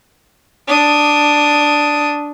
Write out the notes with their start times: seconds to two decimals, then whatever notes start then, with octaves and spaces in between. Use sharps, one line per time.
0.67 D4 D#6